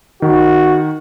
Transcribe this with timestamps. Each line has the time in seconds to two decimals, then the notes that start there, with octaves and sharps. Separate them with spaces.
0.22 D#3 F#4